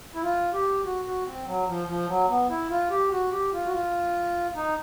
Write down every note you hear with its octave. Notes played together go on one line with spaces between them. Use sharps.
E4
F4
G4
F#4
F#4
C4
F#3
F3
F3
F#3
B3
E4
F4
G4
F#4
G4
F4
F#4
F4
D#4